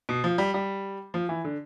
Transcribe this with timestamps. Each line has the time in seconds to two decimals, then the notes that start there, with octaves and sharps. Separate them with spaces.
0.09 B2
0.24 F3
0.38 G3
0.54 G3
1.14 F3
1.29 E3
1.44 D3